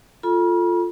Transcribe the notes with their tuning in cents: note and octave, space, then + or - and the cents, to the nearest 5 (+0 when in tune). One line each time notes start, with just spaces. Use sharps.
F4 +0 A4 +0 B5 -45